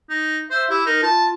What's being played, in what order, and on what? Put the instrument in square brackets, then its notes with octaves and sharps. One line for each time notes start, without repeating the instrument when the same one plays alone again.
[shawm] D#4
[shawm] C5 [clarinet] E5
[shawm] E4 [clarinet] G4
[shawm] D#4 [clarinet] A#4
[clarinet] F4 [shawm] A5